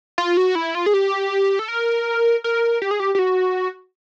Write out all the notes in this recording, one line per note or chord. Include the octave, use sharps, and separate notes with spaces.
F4
F#4
E4
F4
G#4
G4
A4
A#4
A#4
G4
G#4
G4
G4
F#4